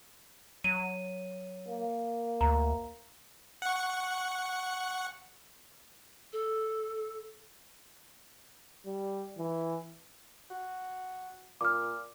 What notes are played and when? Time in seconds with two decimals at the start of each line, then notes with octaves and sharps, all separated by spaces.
0.64 F#3 D#7
1.68 A#3
2.41 D2 A#5
3.62 F#5 C#6
6.33 A4
8.86 G3
9.38 E3
10.50 F#4
11.61 A#2 D6 F6